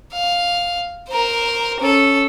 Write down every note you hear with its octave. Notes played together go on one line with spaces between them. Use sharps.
F5
A#4 C5
C#4 A4